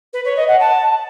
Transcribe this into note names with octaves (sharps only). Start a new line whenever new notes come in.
B4
C#5
D#5
F#5
A5